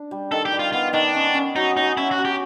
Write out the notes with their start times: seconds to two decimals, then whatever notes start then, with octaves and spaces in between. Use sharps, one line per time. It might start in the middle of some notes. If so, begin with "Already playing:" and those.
Already playing: D4
0.11 G3
0.32 D#3 A4
0.45 G4
0.52 G3
0.59 F4
0.72 B3 F4
0.93 D#3 D4
1.14 C#4
1.34 C#4
1.56 F#3 D#4
1.77 F#3 D#4
1.97 C#4 E4
2.11 F#4
2.18 F#3
2.25 G4